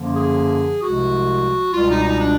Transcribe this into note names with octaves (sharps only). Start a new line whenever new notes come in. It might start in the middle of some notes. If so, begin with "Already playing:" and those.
Already playing: F#2 D3 F3 A#3
G#4
C2 C3 F3 G#3 F#4
C#2 B2 G3 F4
D#4
D#4
D4